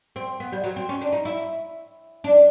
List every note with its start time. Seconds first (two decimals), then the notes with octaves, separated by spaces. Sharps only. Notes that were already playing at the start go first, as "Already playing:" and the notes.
0.16 C4
0.40 B3
0.52 G3
0.64 F#3
0.76 C4
0.89 C#4
1.01 D4
1.13 D#4
1.25 E4
2.24 D4